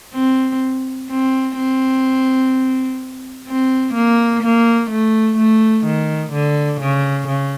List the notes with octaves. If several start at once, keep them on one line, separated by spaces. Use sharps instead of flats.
C4
C4
C4
C4
A#3
A#3
A3
A3
D#3
D3
C#3
C#3